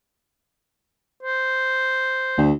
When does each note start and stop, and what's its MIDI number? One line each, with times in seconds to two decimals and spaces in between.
1.23 2.44 72
2.37 2.52 38